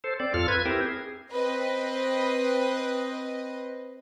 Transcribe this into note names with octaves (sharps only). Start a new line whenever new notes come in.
A4 C5
C4 D5
F2 F4 A4 F6
B4 G#6
C4 E4 G4 A#4
G#4
C4 B4 D#5